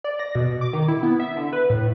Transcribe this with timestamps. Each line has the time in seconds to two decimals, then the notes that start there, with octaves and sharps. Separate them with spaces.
0.04 D5
0.19 A#6
0.35 B2
0.61 D6
0.73 D#3
0.88 E4
1.03 B3
1.20 E5
1.37 D3
1.53 B4
1.70 A2